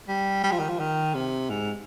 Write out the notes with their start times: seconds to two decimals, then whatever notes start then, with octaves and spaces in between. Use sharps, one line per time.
0.08 G3
0.43 G3
0.52 F3
0.60 D#3
0.69 F3
0.79 D#3
1.15 C3
1.50 G#2